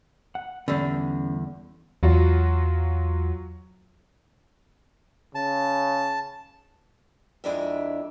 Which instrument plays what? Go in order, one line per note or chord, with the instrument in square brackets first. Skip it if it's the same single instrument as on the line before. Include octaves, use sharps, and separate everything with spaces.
[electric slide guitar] F#5
[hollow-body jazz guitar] E2 D3 [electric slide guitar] G3 C#4
[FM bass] E2 [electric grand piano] F#3 F4 F#4
[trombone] C#3 [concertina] A5
[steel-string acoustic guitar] F2 G#3 D4 E4 A#4 E5